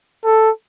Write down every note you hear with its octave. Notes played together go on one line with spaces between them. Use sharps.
A4